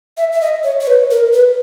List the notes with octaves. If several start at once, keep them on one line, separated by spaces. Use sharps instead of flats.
E5
E5
D#5
C#5
C#5
B4
A#4
B4